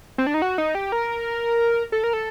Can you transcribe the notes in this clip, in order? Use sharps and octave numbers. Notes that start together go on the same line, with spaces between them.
C4
D4
D#4
F#4
D#4
G4
A#4
A4
A#4
A4